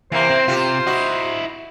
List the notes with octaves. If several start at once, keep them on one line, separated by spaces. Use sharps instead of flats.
C3 E3 A#3 C5
C4
C3 F4 G4
E4 F#4 D#5